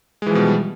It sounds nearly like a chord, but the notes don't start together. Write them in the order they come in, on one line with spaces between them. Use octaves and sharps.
G#3 E3 F3 B2 G3